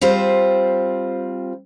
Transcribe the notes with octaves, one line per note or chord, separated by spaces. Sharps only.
G3 C4 F4 C5